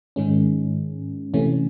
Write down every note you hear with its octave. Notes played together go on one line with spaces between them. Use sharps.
G#2 D#3 G#3 C#4
C3 E3 A3 C#4